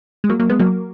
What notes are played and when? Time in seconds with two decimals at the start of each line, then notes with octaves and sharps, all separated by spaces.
0.24 G#3
0.29 F#3 A#3
0.39 F#3 A#3
0.49 G#3 B3
0.59 F#3 A#3